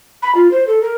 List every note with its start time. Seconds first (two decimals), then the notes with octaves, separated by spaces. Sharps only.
0.22 B5
0.35 F4
0.51 C5
0.67 A4
0.82 A#4